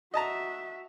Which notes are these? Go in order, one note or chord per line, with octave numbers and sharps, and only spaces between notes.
F#4 D#5 E5 A5 A#5